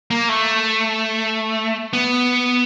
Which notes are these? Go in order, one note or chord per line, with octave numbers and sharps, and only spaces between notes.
A#3
A3
B3